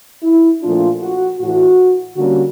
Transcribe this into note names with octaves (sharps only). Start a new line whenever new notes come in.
E4
A#2 F3 A3 D4 F4
F#4
A2 E3 A3 F#4
D3 G3 A#3 C#4 F#4